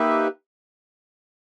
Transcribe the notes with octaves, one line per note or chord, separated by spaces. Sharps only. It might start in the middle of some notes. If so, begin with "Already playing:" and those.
Already playing: A#3 D#4 G4 B4 E5